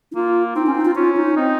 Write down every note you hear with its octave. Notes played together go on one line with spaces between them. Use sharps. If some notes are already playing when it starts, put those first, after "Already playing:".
D#4
A#3 F4
C4 D#4
C#4
D#4
F4
C#4 F4
D#4
C4 D#4